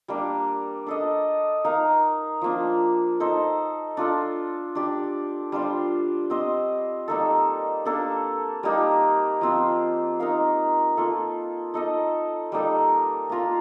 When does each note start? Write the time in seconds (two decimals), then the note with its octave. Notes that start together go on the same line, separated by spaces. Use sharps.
0.08 G3 A#3 D4
0.87 D4 A4 D#5
1.65 D#4 A#4 F5
2.41 F3 A#3 D4
3.20 D#4 A4 C5
3.97 D4 F4 A4
4.75 D4 G4 D5
5.52 G3 D4 F4 C5
6.30 C4 G4 C5 D#5
7.08 G3 A#3 D#4 A4
7.85 A#3 D4 A4
8.63 G3 A#3 D#4 G4
9.41 F3 C4 F4
10.20 D#4 A#4 F5
10.97 A#3 F4 A4
11.74 D#4 A4 D#5
12.52 G3 A#3 D#4 A4
13.30 A#3 F4 A#4